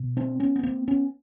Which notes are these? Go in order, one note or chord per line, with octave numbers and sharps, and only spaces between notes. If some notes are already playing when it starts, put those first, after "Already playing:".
Already playing: B2
C4 D4
B3 C#4
B3
A#3 C4
B3 C#4